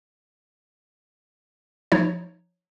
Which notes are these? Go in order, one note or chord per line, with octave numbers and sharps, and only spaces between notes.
F3 D#4 C#5